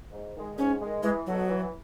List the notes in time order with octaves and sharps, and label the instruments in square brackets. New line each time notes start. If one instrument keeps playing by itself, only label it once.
[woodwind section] G#2
D#3 G#3
[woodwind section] G#2 [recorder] C#4
[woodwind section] D#3 G#3
[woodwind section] E3 [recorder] G#3
[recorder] F#3 [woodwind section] B3 F#4 A4 D#5
[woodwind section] E3